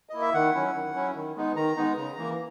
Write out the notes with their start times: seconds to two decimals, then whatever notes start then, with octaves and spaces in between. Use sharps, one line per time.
0.09 A#3 E4 D#5
0.21 E5
0.34 D#3 F#5
0.54 F#3 C#4 E4
0.74 D#3
0.95 F#3 C#4 E4
1.15 D#3
1.36 G#3 B3 D#4
1.56 D#3 A#5
1.77 G#3 B3 D#4
1.97 C#3
2.17 E3 A#3